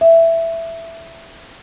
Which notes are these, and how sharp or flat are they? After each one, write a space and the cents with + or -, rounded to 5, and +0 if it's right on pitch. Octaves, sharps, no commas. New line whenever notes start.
E5 +5